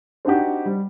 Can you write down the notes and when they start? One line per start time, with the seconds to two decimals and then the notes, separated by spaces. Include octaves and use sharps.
0.25 C4 D4 D#4 F#4 G4
0.66 G3